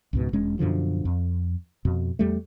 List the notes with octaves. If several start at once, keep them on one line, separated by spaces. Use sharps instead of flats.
C#2 G#2 B2
E1 G#3 C#4
F#2 B2 D3 F3
F2
F2 B2
E2 G3 A3